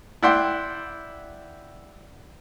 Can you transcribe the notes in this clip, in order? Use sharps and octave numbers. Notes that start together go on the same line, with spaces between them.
E4 D5 F#5 G5 C6